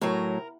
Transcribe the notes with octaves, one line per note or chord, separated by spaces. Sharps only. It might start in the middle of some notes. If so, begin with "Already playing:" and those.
A2 F#3 A#4